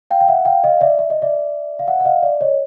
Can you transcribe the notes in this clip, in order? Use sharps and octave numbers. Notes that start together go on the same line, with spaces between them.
F5 G5
G5
E5 F#5
F5 G5
D#5 F5
D5 E5
E5
D#5
D5 E5
F5
E5 F#5
F#5
D#5 F5
D5 E5
C#5 D#5